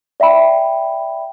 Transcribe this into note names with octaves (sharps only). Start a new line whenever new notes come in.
D5 E5 G5 B5